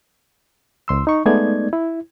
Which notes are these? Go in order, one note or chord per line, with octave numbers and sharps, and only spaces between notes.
C#2 C6 E6
D#4 C#6
G#3 A3 B3 D#4 D5 G#6
E4